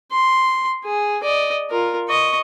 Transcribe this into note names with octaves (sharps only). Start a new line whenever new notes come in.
C6
G#4
D5 D#5
F4 A#4
D#5 C#6